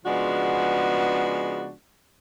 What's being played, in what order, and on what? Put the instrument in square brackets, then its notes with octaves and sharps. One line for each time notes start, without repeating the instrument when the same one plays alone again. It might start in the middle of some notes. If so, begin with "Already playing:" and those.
[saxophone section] C#3 F3 G#3 B3 D4 F#4